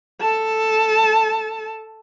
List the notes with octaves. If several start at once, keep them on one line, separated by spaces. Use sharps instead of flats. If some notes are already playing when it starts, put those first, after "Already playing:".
A4 A5